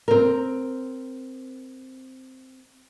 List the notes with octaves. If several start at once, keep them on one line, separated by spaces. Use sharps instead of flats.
C4 A#4